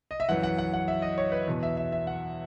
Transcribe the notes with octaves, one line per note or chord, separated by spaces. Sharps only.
D#5
E5
F#2 E3 F#5
F#5
F#5
F#5
E5
D#5
C#5
B4
E2 B2
E5
E5
E5
F#5